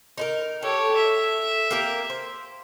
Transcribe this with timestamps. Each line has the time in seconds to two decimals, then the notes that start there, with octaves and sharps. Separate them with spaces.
0.18 D#4 E4 A#4
0.63 G4 A4 C#5
0.97 E5
1.71 A#3 G4 A#4
2.10 C5